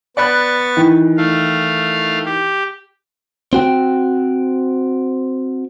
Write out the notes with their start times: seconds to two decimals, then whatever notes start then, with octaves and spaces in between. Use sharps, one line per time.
0.17 B3 D5 B5 C#6 F#6 A6
0.77 D#3 E3
1.17 A3 F5
2.25 G4
3.53 C4 F#4 G5